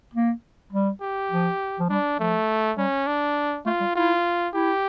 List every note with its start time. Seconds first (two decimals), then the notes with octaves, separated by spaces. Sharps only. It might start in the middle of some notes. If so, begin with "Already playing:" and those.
0.14 A#3
0.72 G3
1.02 G4
1.31 F3
1.79 F3
1.89 G3 D4
2.19 F3 A3
2.77 G3 C#4
3.07 D4
3.66 A3 F4
3.80 G3
3.95 E4 F4
4.54 E4 G4